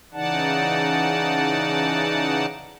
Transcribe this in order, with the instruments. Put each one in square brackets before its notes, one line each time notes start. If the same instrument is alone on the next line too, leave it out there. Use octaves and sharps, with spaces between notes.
[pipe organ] C#3 E3 D#4 D5 F#5 A5